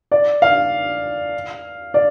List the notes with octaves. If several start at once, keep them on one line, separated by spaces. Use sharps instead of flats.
D5
F5
D5